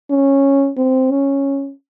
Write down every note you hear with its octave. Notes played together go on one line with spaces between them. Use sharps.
C#4
C4
C#4